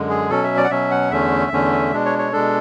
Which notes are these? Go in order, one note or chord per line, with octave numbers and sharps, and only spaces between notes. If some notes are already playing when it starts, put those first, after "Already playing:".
Already playing: F#2 D3 G#3
G#4
B2 F#3 C#4 A4
E5
D5
F#5
B2 F#3 C#4 E5
F#5
E2 D3 A3 C#4 E5
E2 D3 A3 C#4
B2 G#3 D4
C#5
C#5
B2 G#3 D4 A4